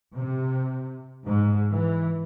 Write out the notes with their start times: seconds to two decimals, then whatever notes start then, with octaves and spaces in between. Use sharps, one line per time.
0.14 C3
1.25 G#2
1.70 E3